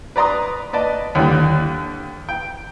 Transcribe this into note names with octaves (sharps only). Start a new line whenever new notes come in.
B4 D5 A#5 C6 D#6
B4 D5 D#5 A5
D#2 D3 G3
G5